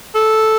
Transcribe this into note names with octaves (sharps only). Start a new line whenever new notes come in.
A4